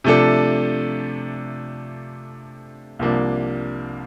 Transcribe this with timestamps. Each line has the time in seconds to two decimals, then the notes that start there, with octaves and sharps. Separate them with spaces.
0.04 C3 F3 A3 D4 A4
2.99 C2 C3 F3 A#3 D4